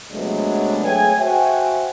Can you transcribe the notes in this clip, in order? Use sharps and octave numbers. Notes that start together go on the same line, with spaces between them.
C3 F#3 G#3 A3 B3 D4
A3 G#4 C#5 G5 G#5
F#4 C5 E5 G5 G#5